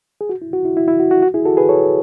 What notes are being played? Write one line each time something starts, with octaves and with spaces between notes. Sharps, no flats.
G#4
F#4
E4
F#4
E4
E4
E4
F#4
F#4
F#4
E4 G#4
F#4 A4
G#4 B4
A4 C#5